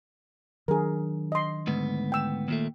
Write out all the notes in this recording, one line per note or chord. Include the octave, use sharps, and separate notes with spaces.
D#3 F#3 D4 G#4 A#4
D#5 C6
D2 G#2 B3
G5 E6
D#2 A#2 A3